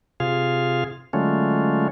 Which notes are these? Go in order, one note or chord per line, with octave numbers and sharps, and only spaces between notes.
C3 F4 G#4 F5
D3 F#3 G#3 A3 C#4 F4